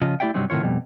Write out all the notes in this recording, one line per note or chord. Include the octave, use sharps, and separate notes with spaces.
C#3 F3 F4 D#5
A3 E4 G4 D5 E5 G5
G2 C3 F#3 G3 C4 D#4
A2 C3 D#3 F4 C#5
F2 B2 G3